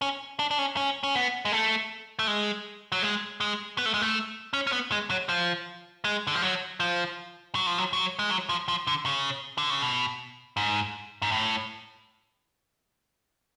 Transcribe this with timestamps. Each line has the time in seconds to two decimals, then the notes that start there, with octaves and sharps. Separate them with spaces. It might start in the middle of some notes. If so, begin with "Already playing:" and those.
0.02 C#4
0.39 D4
0.51 D4
0.58 C#4
0.77 C#4
1.03 C#4
1.15 B3
1.45 G#3
1.52 A3
2.19 A3
2.27 G#3
2.92 F#3
3.03 G#3
3.41 G#3
3.78 B3
3.86 A3
3.94 G#3
4.02 A3
4.53 C#4
4.67 C#4
4.72 B3
4.92 G#3
5.10 F#3
5.29 F3
6.04 G#3
6.27 D3
6.35 F3
6.42 F#3
6.80 F3
7.55 F#3
7.67 F3
7.78 F#3
7.93 F#3
8.19 G#3
8.31 F#3
8.49 F3
8.68 F3
8.87 D3
9.06 C#3
9.58 D3
9.70 C#3
9.82 B2
10.57 G#2
11.22 G#2
11.32 A2